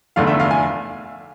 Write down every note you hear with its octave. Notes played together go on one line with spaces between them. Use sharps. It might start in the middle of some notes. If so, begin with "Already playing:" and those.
F1 E2 D3 A3 F5
E5
F5
G#5